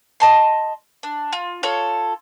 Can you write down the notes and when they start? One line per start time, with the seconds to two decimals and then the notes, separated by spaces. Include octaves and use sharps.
0.20 D#5 A5 C6
1.03 D4
1.32 F4
1.63 F4 A4 C#5